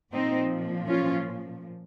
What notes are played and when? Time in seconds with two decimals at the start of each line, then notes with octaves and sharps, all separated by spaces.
0.12 A#2 F3 C4 D#4
0.88 C#4 F4